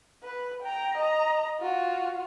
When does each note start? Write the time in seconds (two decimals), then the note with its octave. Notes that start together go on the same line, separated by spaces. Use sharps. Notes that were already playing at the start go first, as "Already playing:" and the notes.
0.23 B4
0.62 G5 A#5
0.97 D#5 A#5
1.60 F4 F#4